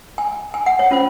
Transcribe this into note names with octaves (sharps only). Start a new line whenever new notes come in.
G#5
G#5
F#5
C#5
C#4 F4 C5